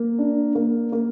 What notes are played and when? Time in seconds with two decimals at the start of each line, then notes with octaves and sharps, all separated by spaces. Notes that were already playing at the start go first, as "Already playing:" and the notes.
Already playing: A#3
0.19 D4
0.55 A#3
0.92 A#3